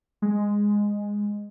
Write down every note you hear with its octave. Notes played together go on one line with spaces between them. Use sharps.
G#3